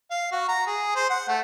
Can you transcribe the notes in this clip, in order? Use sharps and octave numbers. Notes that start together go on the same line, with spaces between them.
F5
F#4
A#5
G#4
C5
F#5
A3